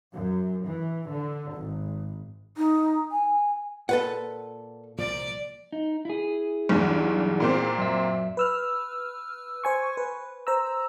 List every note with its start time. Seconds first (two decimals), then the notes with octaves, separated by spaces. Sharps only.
0.13 F#2
0.65 E3
1.08 D3
1.55 G#1
2.57 D#4
3.12 G#5
3.89 A#2 A4 B4 F#5
4.98 C2 A#2 F3 D5
5.72 D#4
6.05 E4 G#4
6.69 B1 E2 G2
7.40 A#2 A#3 C4
7.78 F#2 E5
8.37 B4 E6 F6
9.64 C5 G#5 C#6
9.97 B4
10.47 C5 A#5 E6